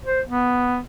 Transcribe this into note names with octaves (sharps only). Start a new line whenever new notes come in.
C5
B3